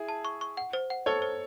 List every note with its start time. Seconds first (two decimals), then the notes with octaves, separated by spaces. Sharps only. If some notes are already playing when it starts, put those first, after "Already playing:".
Already playing: E4 G#4
0.08 A5
0.25 C#6
0.41 C#6
0.57 F#5
0.73 C5
0.90 F#5
1.06 A4 C5 C#5
1.22 C5